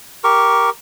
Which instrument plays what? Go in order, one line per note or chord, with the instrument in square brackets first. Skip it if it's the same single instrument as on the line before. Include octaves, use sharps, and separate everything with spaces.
[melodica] G4 A#4 C#6